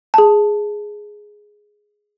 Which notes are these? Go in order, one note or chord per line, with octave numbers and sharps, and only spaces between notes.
G#4 A5